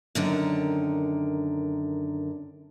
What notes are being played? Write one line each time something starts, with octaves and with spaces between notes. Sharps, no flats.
F#2 D3 D#3